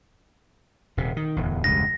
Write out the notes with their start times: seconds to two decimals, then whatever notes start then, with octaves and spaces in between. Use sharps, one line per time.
0.97 D#1 C3
1.16 D#3
1.36 D1 E2
1.64 E1 C#2 G2 A#6